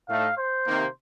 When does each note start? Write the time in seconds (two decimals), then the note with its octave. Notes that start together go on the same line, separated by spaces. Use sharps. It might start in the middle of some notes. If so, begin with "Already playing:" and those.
0.09 A2 A3 D#4 F5
0.38 C5
0.66 C3 D#3 A#3